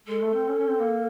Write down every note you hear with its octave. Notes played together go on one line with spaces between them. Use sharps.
G#3 A4
A3
C4
C#4
C#4
C4
A#3